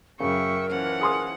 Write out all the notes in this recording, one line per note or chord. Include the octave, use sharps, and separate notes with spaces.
F#2 C#3 A#4 E5 G5 C#6
E3 F3 C#4 F#5
G#4 C6 D#6